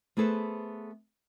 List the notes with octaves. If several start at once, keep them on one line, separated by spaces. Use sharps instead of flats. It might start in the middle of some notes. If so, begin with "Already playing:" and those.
A3 B3 G#4 A4 B4 C5